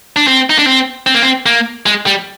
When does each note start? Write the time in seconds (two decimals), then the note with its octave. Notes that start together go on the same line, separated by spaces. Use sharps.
0.16 D4
0.27 C4
0.50 D#4
0.59 D4
0.67 C4
1.07 C4
1.15 A#3
1.22 C4
1.46 A#3
1.86 G#3
2.06 G3